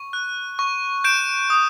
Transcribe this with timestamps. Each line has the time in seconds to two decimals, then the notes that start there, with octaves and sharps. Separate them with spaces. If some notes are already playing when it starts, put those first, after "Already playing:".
Already playing: C#6
0.13 F#6
0.59 C#6
1.04 G6 D7 E7
1.50 D#6